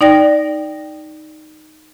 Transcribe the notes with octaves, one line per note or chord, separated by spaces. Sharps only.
D#4 D5 G5 A#6